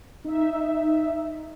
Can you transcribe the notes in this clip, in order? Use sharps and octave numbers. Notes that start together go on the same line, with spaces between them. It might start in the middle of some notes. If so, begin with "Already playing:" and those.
D#4 E5